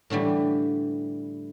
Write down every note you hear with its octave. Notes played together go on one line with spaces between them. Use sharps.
A2 D3 E3 G3